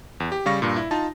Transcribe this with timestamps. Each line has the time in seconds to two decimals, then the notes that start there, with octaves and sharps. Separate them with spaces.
0.20 E2
0.32 G4
0.46 C#3 G3 F5 C#6 A#6
0.62 G2 A#2
0.76 E4
0.91 D#4 F4 A5